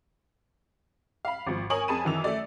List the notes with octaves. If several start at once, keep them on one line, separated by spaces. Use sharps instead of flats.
F5 B5
G#1 F3
A#4 C#5 G#5 C#6 D#6 F#7
F2 G#4 G#5 A5 B5 D#7
F#2 D#3 E3 E6 F7
A3 D5